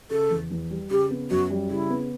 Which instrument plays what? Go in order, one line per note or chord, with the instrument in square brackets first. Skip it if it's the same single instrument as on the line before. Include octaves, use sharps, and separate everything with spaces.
[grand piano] C#3 [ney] A4
[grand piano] E2
E2
G3
[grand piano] C#3 [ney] G4
[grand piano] B3
[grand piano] F#2 [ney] F#4
[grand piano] G3
[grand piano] C#3 [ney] E4
[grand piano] B3